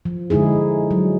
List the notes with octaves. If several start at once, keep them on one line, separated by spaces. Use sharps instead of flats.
F3
D3 G#3 D#4 E4 G#4
F#3